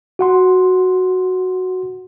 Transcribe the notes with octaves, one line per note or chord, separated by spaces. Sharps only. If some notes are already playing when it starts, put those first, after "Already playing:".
F#4 F#5 C6